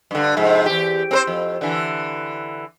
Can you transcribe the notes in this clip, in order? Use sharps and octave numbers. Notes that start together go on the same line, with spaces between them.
G2 D3
F2 G#2 C3
E2 G4
C4 A#4 C5
F2
D3 E3